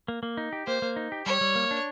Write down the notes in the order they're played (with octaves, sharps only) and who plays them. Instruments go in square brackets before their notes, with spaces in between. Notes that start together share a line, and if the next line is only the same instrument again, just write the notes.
[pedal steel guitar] A#3
A#3
D#4
G4
[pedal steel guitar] A#3 [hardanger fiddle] C5
[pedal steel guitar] A#3
D#4
G4
[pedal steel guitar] G3 [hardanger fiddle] C#5
[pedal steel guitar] G3
A#3
D4